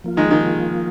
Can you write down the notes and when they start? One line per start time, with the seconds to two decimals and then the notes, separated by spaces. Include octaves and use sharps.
0.04 F3 A#3 F4
0.17 D#3 G#3
0.30 D#3 G#3